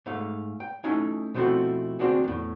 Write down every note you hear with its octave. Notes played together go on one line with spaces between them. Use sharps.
G#2 A3 F5
G5
A3 C#4 D#4 E4 G#5
B2 F3 A3 C4 E4 F#4
D2 A#3 C4 D4 F#4 G#4
E2 A2